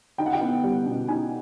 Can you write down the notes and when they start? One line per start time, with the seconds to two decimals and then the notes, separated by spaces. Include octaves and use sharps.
0.18 D#4 G5
0.26 F#5
0.33 G5
0.41 B3
0.64 G3
0.86 B2
1.08 D#4 G#5